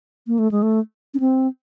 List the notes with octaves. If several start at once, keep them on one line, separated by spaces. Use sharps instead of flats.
A#3
A3
G#3
A3
C#4
C4